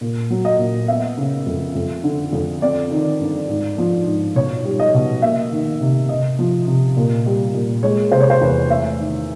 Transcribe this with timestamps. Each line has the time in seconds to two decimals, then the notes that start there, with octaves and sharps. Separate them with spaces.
0.01 A#2
0.30 F#3
0.45 D#5
0.59 A#2
0.88 B3 E5
1.17 C#3
1.47 F2
1.75 F2
2.04 D3
2.33 F2
2.62 C4 D5
2.91 D#3
3.20 G2
3.48 G#2
3.78 F3
4.07 G#2
4.35 B2 C#5
4.64 G3
4.80 D#5
4.94 B2
5.22 A#3 E5
5.52 D#3
5.80 C3
6.09 C3 D#5
6.39 F3
6.67 C3
6.97 A#2
7.26 G3
7.54 A#2
7.83 G#3 C#5
8.12 C3 C5
8.21 C#5
8.30 C5
8.41 E2 B4
8.70 A3 E5
8.98 D#3